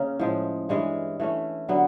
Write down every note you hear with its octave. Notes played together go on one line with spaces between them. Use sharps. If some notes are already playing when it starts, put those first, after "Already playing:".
Already playing: C#3 A#3 C#4
A2 F3 G#3
G2 E3 G#3 C#4
E3 A3 C#4
D3 F#3 B3